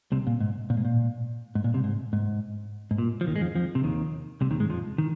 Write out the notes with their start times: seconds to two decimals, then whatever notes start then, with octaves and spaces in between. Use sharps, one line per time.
0.12 C2 C3
0.27 A#2
0.40 G#2
0.70 A#2
0.77 G#2
0.85 A#2
1.55 G#2
1.64 A#2
1.74 C2 C3
1.84 G#2
2.13 G#2
2.91 G#2
2.98 A#2
3.21 F3
3.27 D#2 D#3
3.36 G#3
3.41 F2 F3
3.55 F2 F3
3.75 C3
3.84 D#2 D#3
4.41 C2 C3
4.51 D#2 D#3
4.60 G#2 G#3
4.70 F2 F3
4.98 D#3